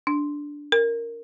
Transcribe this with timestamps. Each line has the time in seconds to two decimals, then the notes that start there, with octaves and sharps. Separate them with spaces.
0.07 D4
0.72 A#4